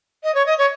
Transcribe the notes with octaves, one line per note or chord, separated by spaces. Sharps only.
D#5
C#5
D#5
C#5